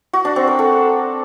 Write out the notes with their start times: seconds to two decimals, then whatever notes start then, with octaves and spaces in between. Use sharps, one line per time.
0.13 F#4
0.25 D4
0.36 C4
0.47 A#4
0.59 A4